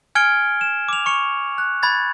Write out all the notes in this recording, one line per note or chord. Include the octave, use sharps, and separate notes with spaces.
G#5 F6 G#6 C#7 D7 G7
E7
D6 F7
C#6 C#7 F7
F#6
B5 G#6 A6